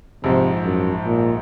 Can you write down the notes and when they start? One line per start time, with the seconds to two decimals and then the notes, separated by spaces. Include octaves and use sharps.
0.24 A#1 G#2 C3 F3
0.65 F#2
1.05 A#2